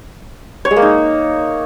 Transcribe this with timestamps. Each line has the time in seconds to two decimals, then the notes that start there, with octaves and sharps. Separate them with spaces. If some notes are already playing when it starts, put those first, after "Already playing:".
0.65 C#5
0.71 G#3
0.76 A#3
0.82 D#4